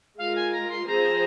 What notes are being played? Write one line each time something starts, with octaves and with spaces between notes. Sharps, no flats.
G#3 F4 A#4 F5
G#5
A#5
C6
F3 C4 G#4 C5 A#5